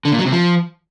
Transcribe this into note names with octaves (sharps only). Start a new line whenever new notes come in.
D3
A#2
F#3
C3
F3